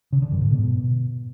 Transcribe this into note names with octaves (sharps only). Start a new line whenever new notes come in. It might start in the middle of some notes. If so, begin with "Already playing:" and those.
C#3
D3
F#2
G#2
B2